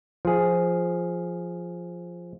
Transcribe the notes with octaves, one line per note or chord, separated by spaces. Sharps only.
F3 G#4